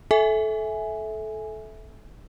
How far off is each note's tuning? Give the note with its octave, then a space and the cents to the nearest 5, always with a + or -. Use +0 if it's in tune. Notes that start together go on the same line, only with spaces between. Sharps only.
A4 -20 E5 -10 G#5 +5